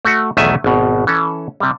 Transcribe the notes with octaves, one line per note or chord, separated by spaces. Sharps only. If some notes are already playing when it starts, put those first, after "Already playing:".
A3 F#4
B1 E2 D#3 A3 E5 G#5
G#1 B2
E3 C#4 A4
C3 G3